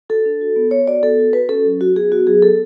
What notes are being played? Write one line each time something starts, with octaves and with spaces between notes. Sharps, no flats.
F#4 A4
D4
F#4
B3
B3 C#5
F#4 D5
B3 A4
F#4
F#4 B4
C#4 A4
F#3
F#3 F#4
B3 G#4
B3 F#4
F#3 G#4
B3 A4